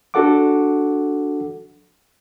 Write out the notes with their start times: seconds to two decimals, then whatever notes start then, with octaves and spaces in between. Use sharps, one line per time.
0.14 D4 F#4 A4 F#5 D6